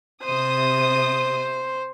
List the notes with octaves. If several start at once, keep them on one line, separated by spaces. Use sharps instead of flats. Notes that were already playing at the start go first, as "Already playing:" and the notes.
C3 C5 D#6